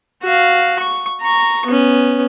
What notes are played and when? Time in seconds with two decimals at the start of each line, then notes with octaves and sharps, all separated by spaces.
0.23 F#4 F5
0.79 C#6
1.21 A#5 C#6
1.66 B3 C#4